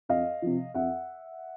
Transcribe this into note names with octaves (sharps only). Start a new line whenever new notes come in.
F2 D#5 F5
C3 F3
F2 E5 F#5